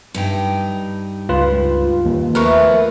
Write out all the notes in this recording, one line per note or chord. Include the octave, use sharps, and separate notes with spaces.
G2 D#4 G5
C#2 F4 B4
D#2
F3 A3 B3 A#4 B4 C#6